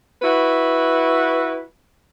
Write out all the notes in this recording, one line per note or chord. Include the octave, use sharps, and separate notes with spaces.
E4 F#4 B4